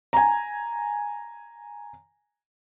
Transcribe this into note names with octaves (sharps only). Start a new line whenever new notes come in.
G#5 A#5